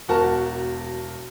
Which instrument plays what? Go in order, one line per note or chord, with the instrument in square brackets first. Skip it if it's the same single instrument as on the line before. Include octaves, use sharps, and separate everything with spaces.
[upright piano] E1 F#4 A#4 A5